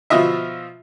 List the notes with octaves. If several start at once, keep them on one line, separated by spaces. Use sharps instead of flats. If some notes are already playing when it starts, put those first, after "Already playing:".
B2 F3 F4 D#5 E5